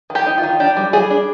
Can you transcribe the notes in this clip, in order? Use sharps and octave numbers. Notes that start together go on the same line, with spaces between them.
D#3
G4
D#4
F4
D#3
D4 G4
G3
G3 G#4
D4